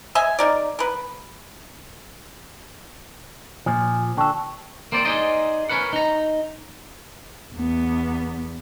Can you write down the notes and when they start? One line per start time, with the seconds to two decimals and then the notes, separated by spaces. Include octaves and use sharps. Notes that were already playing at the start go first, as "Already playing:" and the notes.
0.15 D#5 E5 G#5
0.39 D#4 A#4 D5
0.79 A#4 B4
3.66 A#2 F3 G#5
4.17 D3 A4 G5 A5 C#6
4.92 A#3 C4 C5 D5
5.05 D#4 G#4 C5 D5 D#5
5.69 C#4 A#4 B4 F#5
5.93 D#4 A#5
7.55 E2 B3